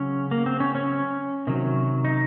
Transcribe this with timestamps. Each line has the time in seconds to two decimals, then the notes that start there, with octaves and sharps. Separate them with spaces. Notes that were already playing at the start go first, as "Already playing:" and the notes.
Already playing: C#3 F#3 C#4
0.31 A#3
0.46 C4
0.60 C#4
0.75 C#4
1.47 C3 D#3 F#3
2.05 D#4